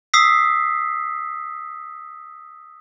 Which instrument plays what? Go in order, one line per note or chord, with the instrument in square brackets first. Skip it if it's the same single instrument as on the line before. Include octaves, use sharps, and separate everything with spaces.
[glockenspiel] D#6 E6 B6 C7